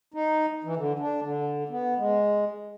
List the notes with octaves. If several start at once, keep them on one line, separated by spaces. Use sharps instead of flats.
D#4
E3
D3
D4
D3
B3
G#3